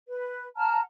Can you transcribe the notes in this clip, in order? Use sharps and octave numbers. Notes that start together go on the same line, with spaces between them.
B4
F#5 A5 A#5 F6